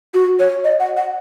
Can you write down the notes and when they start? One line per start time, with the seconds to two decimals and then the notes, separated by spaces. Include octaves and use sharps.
0.14 F#4
0.39 C#5
0.64 D#5
0.80 F#5
0.96 F#5